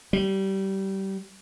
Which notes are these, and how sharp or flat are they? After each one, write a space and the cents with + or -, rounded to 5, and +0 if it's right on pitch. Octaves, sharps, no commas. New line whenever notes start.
G3 -25